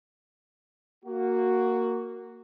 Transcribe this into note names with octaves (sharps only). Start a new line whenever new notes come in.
A#3 F#4